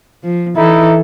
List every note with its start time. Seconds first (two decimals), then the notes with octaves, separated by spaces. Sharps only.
0.23 F3
0.56 E3 D#4 E4 A4